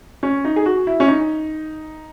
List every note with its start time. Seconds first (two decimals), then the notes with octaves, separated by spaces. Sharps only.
0.23 C#4
0.45 D#4
0.56 G#4
0.65 F#4
0.87 E4
1.00 C#4
1.08 D#4